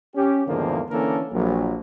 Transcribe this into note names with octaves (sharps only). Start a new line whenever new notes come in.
C#4 G4
E2 G#2 D3 D#3 F3 A#3
D3 E3 A#3 C#4 A4 A#4
A#1 F#3